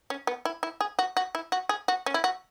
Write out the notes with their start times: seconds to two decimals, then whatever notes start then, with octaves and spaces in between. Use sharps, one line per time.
0.10 C#4
0.27 B3
0.45 E4
0.63 E4
0.81 G#4
0.99 F#4
1.17 F#4
1.35 E4
1.52 F#4
1.69 G#4
1.88 F#4
2.06 C#4
2.14 E4
2.24 F#4